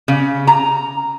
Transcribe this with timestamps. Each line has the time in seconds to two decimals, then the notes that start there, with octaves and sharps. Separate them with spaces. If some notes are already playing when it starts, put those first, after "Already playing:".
0.08 C#3
0.47 A#5